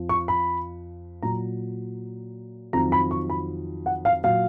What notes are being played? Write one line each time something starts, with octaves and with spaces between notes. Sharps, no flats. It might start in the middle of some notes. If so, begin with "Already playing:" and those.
Already playing: F2 F3
C#6
B5
A#2 F#3 A#5
F2 D#3 F#3 A#5
B5
C#6
B5
F#5
F5
A#2 F#3 F5